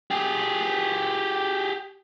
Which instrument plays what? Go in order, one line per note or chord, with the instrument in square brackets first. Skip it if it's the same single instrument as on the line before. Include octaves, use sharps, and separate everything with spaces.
[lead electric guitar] G4 G#4